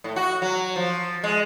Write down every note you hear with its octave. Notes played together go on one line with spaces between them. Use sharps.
A2
F#4
F#3
F3
G#3